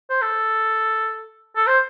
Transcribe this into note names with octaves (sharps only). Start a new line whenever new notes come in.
C5
A4
A4
C5